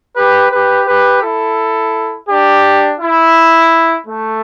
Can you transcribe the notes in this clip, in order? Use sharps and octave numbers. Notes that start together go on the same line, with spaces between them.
G4 B4
G4 B4
G4 B4
E4 A4
D4 G4
E4
A3